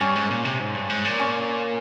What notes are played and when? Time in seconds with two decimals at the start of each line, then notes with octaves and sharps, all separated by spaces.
0.01 G2 C#4
0.16 G#2
0.30 A#2
0.45 C3
0.60 G#2
0.75 G2
0.90 G#2
1.05 A#2
1.19 C#4